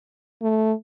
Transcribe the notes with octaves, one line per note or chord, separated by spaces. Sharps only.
A3